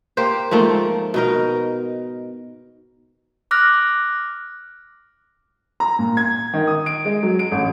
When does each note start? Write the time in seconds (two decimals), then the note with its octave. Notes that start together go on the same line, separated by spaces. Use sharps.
0.17 A#3 G4 C5
0.51 G#2 F3 A3 A#3
1.14 B2 D#4 A#4
3.51 D6 F6 F#6 A#6
5.80 A#5
5.99 A#2
6.17 G#6
6.53 D#3
6.67 D#6
6.86 D7
7.05 G#3
7.23 F#3
7.39 D7
7.51 A1